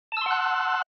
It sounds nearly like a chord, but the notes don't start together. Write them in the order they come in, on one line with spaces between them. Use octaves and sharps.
A5 E6 C6 F#5 F#6